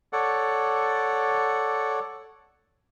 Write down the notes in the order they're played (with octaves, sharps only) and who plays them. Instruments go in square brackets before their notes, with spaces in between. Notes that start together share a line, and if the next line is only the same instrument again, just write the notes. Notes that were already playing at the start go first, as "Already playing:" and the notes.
[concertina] A4 C#5 D5 F#5